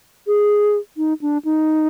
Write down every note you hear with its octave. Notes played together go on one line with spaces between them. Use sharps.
G#4
D#4
D4
D#4